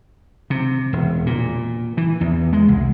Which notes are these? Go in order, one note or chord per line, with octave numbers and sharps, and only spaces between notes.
C3
E1
A#2
E3
E2
G#3
C2